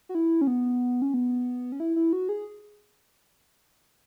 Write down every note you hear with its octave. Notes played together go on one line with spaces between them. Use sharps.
F#4
E4
C#4
B3
C#4
B3
C#4
E4
E4
F#4
G#4